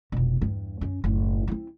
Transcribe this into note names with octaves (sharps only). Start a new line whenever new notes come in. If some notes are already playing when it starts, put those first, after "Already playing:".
F1 B2
E2 G2
F#2 C#4
F#1 A2
C4 E4